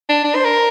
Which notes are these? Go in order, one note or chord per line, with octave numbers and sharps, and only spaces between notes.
D4
D4
C5
A#4